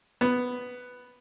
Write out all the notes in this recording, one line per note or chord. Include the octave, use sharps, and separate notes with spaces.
B3